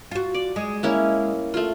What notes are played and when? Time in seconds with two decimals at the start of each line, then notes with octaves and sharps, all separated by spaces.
0.11 F4 F#4
0.35 D5
0.56 G#3
0.83 A#3 C#4 E4
1.54 A3 F4